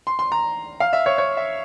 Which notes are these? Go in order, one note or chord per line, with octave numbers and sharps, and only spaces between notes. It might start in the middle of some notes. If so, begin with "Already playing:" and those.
C6
C6
A#5
F5
E5
C#5
C#5
E5